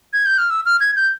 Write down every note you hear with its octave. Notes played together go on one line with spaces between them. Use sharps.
G#6
G6
F6
E6
F6
G#6
G6